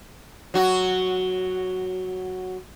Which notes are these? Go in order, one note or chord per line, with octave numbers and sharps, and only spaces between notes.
F#3 F#4